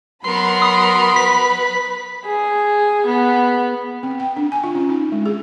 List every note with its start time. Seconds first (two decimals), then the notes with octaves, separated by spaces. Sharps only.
0.24 F#3 B3 A#4 B5 C6
0.62 D#6
1.16 B4 B6
2.26 G#4
3.06 B3
4.03 C4
4.20 G5
4.36 D4
4.52 G#5
4.64 F4
4.75 C#4
4.89 D#4
5.12 G#3
5.26 G#4